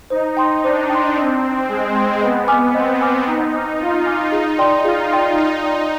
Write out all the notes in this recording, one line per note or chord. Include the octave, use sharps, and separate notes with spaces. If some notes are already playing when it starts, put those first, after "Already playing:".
D#4 C5
G5 C6
D4 C5
G5 C6
C4 C5
G5 C6
G#3 C5
G5 C6
B3 D#5
G#5 D6 F6
C4 D#5
G#5 D6 F6
D#4 D#5
G#5 D6 F6
F4 D#5
G#5 D6 F6
D#4 G#4
D5 G5 C6
F4 G#4
D5 G5 C6
D#4 G#4
D5 G5 C6